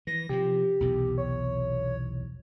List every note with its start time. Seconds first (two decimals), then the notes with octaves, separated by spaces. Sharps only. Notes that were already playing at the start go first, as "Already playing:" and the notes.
0.07 E3 A#6
0.29 C3 D#3 F3 G4
0.80 B1 E2 C3
1.18 C#5